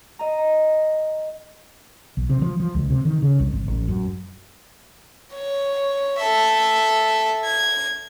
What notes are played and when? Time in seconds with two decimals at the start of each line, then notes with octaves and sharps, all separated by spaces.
0.19 D#5 A#5
2.17 B1
2.30 C3
2.42 F3
2.60 F3
2.74 C#2
2.90 C3
3.05 D#3
3.22 C#3
3.40 C2
3.52 G#1
3.68 A1
3.88 F#2
5.33 C#5
6.19 A4 E5
7.46 G#6